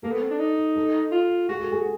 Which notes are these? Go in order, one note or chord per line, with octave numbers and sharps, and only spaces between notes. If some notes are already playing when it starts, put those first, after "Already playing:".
A#3 A4
B3
C4
D4
D#4
A4
F4
F#4 G#4
A4
G#4